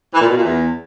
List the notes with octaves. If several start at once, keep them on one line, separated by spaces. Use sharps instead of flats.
E3
A#2
B2
A#2
E2